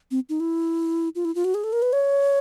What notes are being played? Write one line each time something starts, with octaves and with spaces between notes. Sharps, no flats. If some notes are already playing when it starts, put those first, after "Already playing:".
C4
D#4
E4
F4
E4
F4
F#4
G#4
A4
A#4
B4
C#5